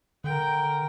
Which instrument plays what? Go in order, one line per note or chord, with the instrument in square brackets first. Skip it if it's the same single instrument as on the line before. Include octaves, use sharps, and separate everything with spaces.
[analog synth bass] D3 [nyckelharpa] A#4 G5